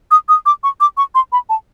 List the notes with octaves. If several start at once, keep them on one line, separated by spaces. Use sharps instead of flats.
D#6
D#6
D6
C#6
D6
C#6
C6
B5
A5